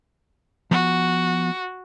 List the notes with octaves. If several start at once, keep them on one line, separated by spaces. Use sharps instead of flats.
F3 B3 F#4 F#5